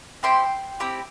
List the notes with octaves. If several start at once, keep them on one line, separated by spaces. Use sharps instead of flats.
C4 E4 G4 G5 C6
C4 E4 G4